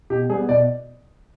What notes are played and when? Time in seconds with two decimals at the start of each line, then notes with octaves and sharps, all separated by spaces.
0.10 B2 G4
0.29 G3 G#4
0.33 B3
0.49 B2 D5